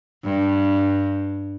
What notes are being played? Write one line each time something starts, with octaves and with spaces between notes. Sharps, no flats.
G2